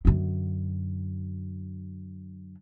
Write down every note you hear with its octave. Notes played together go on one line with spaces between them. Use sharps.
F#2 D3